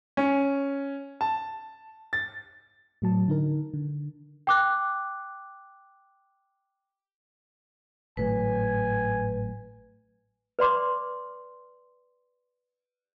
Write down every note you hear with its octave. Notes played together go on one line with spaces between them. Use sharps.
C#4
A5
A6
A2 F#3 A5
D3 D#4 A#4
D3
G5 D6 F#6
G#1 A2 F#3 B4 G#5
B4 D5 C6 D6